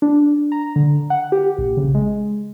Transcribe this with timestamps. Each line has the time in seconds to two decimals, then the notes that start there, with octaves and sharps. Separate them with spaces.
0.02 D4
0.52 A#5
0.76 D3
1.10 F#5
1.32 G4
1.58 A#1
1.77 C#3
1.94 G#3